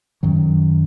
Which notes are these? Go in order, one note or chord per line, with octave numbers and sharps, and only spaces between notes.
F#2 D#3 F#3